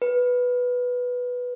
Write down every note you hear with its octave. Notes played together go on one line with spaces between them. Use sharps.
B4